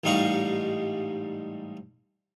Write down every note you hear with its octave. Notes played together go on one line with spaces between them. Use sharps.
A1 G#2 G3 D#4 F5 C#6